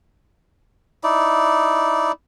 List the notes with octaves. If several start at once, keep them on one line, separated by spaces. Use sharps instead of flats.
D#4 E4 D5